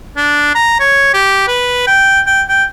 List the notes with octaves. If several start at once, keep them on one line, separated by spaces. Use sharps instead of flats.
D4
A#5
C#5
G4
B4
G5
G5
G5